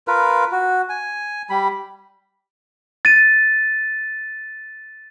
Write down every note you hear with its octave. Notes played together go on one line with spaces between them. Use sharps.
F4 A#4 B4
F#4
G#5
G3 B5
A6 D#7